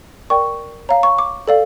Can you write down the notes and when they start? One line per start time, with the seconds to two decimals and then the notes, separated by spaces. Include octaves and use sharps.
0.30 A#4 D5 G5 C#6
0.89 C#5 F5 A#5
1.03 C#6
1.19 D6
1.47 A4 D5 F5